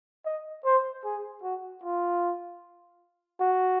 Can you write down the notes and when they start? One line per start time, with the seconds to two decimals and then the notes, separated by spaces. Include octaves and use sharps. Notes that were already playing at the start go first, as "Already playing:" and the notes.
0.25 D#5
0.65 C5
1.05 G#4
1.43 F#4
1.83 F4
3.40 F#4